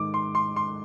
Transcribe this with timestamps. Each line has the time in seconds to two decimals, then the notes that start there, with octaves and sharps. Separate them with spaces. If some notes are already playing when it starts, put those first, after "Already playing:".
Already playing: G#2 D#3 D6
0.14 C6
0.35 C6
0.56 C6